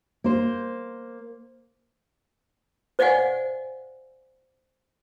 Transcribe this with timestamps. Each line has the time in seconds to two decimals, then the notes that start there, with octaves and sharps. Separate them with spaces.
0.24 A#3 C5
2.99 C5 D5 D#5 F5 F#5 G#5